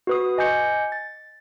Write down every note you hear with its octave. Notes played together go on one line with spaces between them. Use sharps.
F#4 B4 D#6
D#5 G#5 D6 G6 C#7
A6